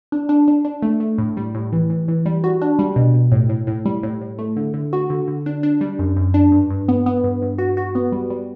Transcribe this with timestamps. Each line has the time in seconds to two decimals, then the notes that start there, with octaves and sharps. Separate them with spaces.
0.12 D4
0.29 D4
0.48 D4
0.65 D4
0.82 A3
1.00 A3
1.18 A2
1.37 G3
1.55 A2
1.73 E3
1.90 E3
2.08 E3
2.26 G3
2.44 F#4
2.62 D4
2.79 G3
2.96 B2
3.14 B2
3.32 A2
3.49 A2
3.67 A2
3.86 G3
4.03 A2
4.21 A2
4.39 A3
4.57 D3
4.74 D3
4.93 F#4
5.10 D3
5.28 D3
5.46 D4
5.63 D4
5.81 G3
5.99 F#2
6.16 F#2
6.34 D4
6.52 G2
6.70 G2
6.88 B3
7.06 B3
7.24 G2
7.42 G2
7.58 F#4
7.77 F#4
7.95 B3
8.12 G3
8.30 G3